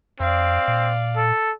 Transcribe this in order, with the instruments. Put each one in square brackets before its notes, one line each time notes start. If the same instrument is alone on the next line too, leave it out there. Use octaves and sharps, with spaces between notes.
[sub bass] F2 [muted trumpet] C4 [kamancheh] D5 F5
[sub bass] A#2
[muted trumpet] A4